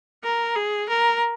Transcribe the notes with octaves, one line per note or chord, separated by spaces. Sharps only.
A#4
G#4
A#4